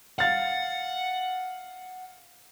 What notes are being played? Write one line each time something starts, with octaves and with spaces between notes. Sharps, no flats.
F5 F#5 A6